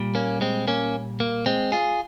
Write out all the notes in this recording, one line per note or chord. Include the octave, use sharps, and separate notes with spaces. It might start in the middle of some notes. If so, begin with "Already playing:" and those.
Already playing: A#2 G3
A#3 C#4
G#3 C4
A#3 C#4
A#3
G#3 C4
F4 G#4